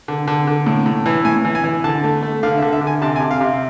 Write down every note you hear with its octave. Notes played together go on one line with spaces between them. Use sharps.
D3
D3
D3
A2
A2
E3
A2 G#5
E3
G#5
E3
D3 A5
A3
A3
D3 F5
E5
D3
E5
D3
G#5
C3 A5
G#5
C3
F5
C3